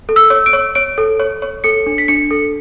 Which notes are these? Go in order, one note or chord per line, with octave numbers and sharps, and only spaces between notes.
A4
E6
C#5
D7
C#5
C#5 D7
A4
C#5
C#5
A4 C#7
D4
B6
D4 C#7
A4